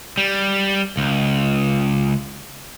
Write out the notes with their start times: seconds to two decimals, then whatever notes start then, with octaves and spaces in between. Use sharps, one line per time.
0.18 G3
0.97 C#2